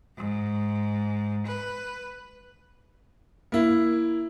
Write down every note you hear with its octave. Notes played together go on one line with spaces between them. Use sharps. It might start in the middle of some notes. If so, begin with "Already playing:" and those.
G#2
B4
A#3 E4